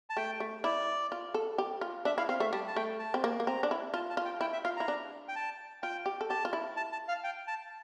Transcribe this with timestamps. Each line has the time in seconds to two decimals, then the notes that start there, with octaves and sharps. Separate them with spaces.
0.10 A5
0.17 A3 G5
0.40 A3
0.64 E4 D5
1.12 F4
1.34 A4
1.58 G4
1.81 F4
2.05 D4 E5
2.18 E4 F5
2.29 C4 F5
2.40 A3 E5
2.53 G3 A5
2.68 A5
2.76 A3 G5
2.99 A5
3.14 C4
3.24 A#3
3.40 A#3
3.47 C4 A#5
3.63 D4
3.71 E4
3.94 F4 A5
4.10 A5
4.17 F4
4.25 G5
4.41 E4 G5
4.53 E5
4.64 F4 F5
4.77 E4 A#5
4.88 D4
5.28 G5
5.35 A5
5.83 F4 G5
6.06 G4
6.21 A4
6.29 G4 A5
6.45 F4
6.53 E4
6.77 A5
6.92 A5
7.08 F5
7.24 G5
7.47 A5